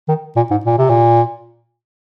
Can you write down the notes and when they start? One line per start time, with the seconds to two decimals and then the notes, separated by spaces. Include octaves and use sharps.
0.08 D#3
0.36 A#2
0.51 G#2
0.65 A#2
0.78 C3
0.90 A#2